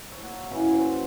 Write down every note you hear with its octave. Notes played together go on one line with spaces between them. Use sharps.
C#5 E5 C#6
A#3 F#4 F#5
F#2 C#3 E3 F#4
C5 G#5